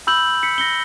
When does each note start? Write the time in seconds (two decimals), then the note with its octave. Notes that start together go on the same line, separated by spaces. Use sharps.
0.07 B5 E6 G6 F#7
0.43 B6 C#7
0.58 A#6 C#7 G7